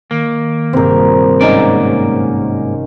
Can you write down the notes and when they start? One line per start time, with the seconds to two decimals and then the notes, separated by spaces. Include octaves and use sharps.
0.11 D#3 A#3
0.73 A#1 G2 C3 C4 A#4
1.41 G#2 A#3 C#4 D#4 F#4 D5